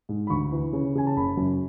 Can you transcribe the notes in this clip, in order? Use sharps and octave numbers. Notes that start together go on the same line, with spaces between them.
G#2
B5
D2 C#6
E3
C#3
C#3 G#5
A5
F#1 B5
F#2